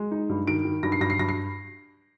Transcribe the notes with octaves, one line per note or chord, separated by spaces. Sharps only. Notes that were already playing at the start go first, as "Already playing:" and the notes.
Already playing: G#3
D#4
G2
D#3 D7
D#3
G2 A#6
C7
G2 A#6
C7
G2 A#6
C7